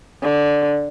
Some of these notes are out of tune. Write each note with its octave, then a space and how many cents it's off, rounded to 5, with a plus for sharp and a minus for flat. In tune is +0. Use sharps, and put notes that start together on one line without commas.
D3 +0